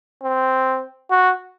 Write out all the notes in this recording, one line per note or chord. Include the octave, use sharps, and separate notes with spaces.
C4
F#4